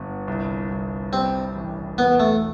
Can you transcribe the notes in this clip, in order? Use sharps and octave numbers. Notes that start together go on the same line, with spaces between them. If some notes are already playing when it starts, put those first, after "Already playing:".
Already playing: G1 B3
C2
C2
G3 C4
A1
E1 B3
A3